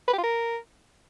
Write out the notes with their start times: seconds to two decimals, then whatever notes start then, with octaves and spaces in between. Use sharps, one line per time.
0.08 B4
0.13 G4
0.18 F4
0.23 A#4